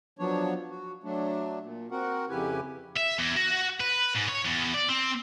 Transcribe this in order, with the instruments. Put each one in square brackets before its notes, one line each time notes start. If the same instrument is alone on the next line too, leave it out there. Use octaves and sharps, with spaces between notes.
[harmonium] F3 F#3 B3 D4 C#5
F#4
F#3 A3 D4
A#2
C4 F#4 A#4 F#5
F2 C#3 E4 G4 B4 G#5
[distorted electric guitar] E5
E2
F#4
B4
G#2
C#5
E2
D5
C4